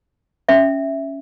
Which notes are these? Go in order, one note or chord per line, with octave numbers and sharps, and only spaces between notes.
C#4 E5